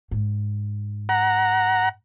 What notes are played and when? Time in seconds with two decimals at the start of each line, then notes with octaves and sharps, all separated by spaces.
0.11 G#2
1.09 F#5 A#5